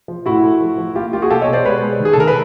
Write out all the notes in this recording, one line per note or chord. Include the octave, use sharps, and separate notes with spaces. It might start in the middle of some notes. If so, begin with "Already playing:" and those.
F3
A2 E4 F#4
A3
F3
F3
A#3 F4 G4
A#3 F4 G4
F#4 G#4
B2 G4 A4
C#5 D#5
B2
C5 D5
G#3 B4 C#5
G#3
D#3
G#4
A4
D#3 A#4
B4